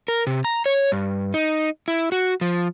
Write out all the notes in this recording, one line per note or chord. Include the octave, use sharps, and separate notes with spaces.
A#4
C3
A#5
C#5
G2
D#4
E4
F#4
F3